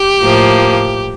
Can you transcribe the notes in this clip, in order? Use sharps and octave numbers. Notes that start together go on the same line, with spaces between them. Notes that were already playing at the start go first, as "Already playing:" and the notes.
Already playing: G4
A2 F3 A#3